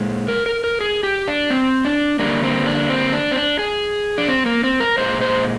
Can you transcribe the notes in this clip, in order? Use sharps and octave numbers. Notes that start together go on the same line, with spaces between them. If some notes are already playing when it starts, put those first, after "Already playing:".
Already playing: A#2 G#3
A#4
A#4
A#4
G#4
G4
D4
C4
D4
D3 G3 A#3 D4
C4
D4
C4
D4
C4
D4
G#4
D4
C4
A#3
C4
A#4
A#2 G#3 C5
C5